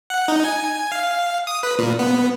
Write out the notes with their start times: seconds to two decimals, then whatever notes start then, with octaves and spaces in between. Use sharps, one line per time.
0.10 F#5
0.28 D#4
0.44 G#5
0.92 F5
1.47 D#6
1.63 B4
1.79 A#2
1.99 B3